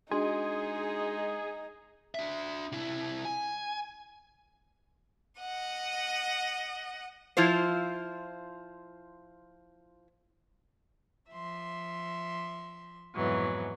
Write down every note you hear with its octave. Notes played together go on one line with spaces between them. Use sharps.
G#3 D4 D#4 F#4 G#4 C6
D4 E5
C3 E4
G#5
D#5 F#5
F3 E4 F4 C5
F3 E5 C6
F2 G#2 B2 E3 F#3